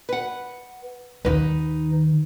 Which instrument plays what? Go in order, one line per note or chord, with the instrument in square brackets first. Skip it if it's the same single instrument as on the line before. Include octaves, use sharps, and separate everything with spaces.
[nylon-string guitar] B4 F#5
[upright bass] D#2 D#3 [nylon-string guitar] D#4 B4